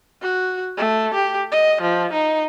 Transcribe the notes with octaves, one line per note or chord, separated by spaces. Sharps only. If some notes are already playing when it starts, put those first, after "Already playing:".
F#4
A3
G4
D#5
F3
D#4